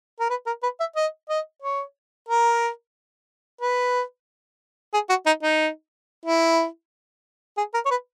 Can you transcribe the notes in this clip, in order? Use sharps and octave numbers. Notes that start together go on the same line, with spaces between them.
A#4
B4
A#4
B4
E5
D#5
D#5
C#5
A#4
B4
G#4
F#4
D#4
D#4
E4
G#4
A#4
C#5
B4